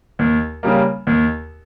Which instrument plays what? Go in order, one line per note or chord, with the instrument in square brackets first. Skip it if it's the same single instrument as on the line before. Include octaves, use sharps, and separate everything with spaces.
[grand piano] D#2
C#3 G3 A#3
D#2